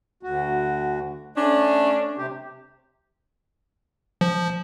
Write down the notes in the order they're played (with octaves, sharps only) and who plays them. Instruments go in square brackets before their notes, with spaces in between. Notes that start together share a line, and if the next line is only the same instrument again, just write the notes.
[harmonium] D2 F#4
[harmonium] A3 [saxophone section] C#4 D4
[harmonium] C3 G4
[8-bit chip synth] F3